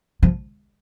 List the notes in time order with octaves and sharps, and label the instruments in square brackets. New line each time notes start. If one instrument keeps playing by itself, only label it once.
[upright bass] F3